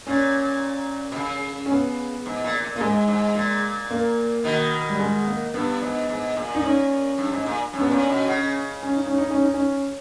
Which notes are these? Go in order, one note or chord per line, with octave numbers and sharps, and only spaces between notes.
A#2 C#4
B2
C#3
C#4
B3
G#2
A#2
A#2
A#2 A#3
G#2 G#3
G#2
A#2
A#3
B2 D#3
G3
G#3
A#3
G2 B3
G#2
G#2
A#2
D#4
C#4
G2
G#2
A#2
G2 C#4
B3
A#2 C#4
B2
C#3
C#4
D#4
C#4
D#4
C#4
D#4
C#4